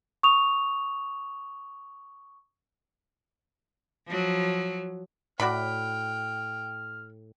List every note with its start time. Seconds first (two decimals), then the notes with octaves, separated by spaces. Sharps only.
0.23 C#6 D#6 F7
4.07 F3 F#3
5.40 A2 F#4 D5 G5 B5 F6